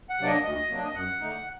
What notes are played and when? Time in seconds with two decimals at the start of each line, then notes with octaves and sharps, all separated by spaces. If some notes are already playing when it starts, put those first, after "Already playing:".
0.10 F#5
0.18 C3 F#3 A#3 D4 D5
0.26 D#5
0.44 D2 D#5
0.69 C3 F#3 A#3 D4
0.84 D#5
0.94 F#2 F#5
1.21 D3 A3 D#4